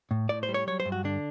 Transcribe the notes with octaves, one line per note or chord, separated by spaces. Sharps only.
A2
A2 D5
C5
G3
C#5
F#3 C#5
C5
G2
F#4
D3 D4